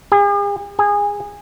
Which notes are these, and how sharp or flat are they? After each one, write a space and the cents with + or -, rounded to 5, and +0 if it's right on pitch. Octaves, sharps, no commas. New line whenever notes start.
G#4 -45
G#4 -20